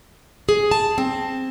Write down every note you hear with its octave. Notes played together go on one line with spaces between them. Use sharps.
G#4
A5
C4